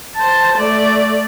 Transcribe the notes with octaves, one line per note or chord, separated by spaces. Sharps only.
C5 A5
A3 D5